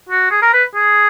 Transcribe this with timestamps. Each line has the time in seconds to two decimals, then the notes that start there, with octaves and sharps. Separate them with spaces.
0.09 F#4
0.31 G#4
0.42 A#4
0.53 B4
0.75 G#4